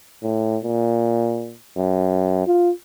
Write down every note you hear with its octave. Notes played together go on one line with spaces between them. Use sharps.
A2
A#2
F#2
F4